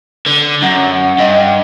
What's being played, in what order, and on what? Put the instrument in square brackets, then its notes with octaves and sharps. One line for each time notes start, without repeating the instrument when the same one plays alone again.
[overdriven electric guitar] D3
[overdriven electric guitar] F#2 [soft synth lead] F#5
[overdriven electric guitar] G2 [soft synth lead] D#5